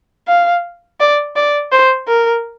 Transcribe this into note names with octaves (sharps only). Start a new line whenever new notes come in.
F5
D5
D5
C5
A#4